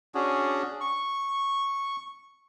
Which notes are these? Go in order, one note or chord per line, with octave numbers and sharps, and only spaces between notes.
C#4 D4 F#4 G#4
C#6